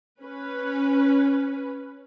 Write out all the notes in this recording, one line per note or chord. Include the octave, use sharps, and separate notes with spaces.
C#4 B4